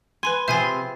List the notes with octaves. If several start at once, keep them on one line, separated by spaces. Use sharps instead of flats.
B4 G#5 B5 C6
C3 F3 F4 G#4 C5 E5 G#5 B5